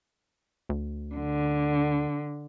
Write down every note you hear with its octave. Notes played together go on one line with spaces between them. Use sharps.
D2
D3